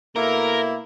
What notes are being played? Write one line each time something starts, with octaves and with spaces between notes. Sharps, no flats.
B2 A3 A#3 E4 A#4